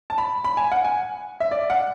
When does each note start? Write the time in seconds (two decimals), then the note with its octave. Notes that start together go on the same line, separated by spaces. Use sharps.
0.10 A5
0.18 B5
0.44 B5
0.57 G#5
0.72 F#5
0.84 G#5
1.40 E5
1.51 D5
1.70 F#5